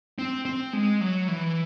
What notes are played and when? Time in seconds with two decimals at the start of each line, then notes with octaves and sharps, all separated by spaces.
0.19 C4
0.45 C4
0.73 G#3
1.01 F#3
1.28 E3